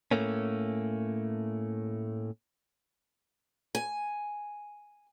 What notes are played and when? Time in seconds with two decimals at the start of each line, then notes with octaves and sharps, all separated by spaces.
0.11 A2 A3 A#3 C#4
3.75 G#5